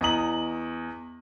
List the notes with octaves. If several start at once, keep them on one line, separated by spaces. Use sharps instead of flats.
E2 D#5 A#5 D#6 F#7